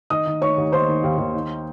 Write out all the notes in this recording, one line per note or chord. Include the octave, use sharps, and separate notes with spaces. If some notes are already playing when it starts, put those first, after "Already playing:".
D#3 D#5 D#6
D#3
D#3 C#5 C#6
D#2
D#3 C5 C6
D#3
D#2
D#2
D#3